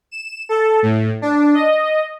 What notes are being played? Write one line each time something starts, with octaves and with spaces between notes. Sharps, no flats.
E7
A4
A2
D4
D#5